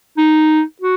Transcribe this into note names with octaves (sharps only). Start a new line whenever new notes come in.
D#4
F#4